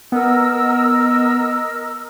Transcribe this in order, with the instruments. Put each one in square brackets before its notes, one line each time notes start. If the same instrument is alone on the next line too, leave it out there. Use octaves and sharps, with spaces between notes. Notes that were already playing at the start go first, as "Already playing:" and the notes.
[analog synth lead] B3 [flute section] A#4 D#5 E6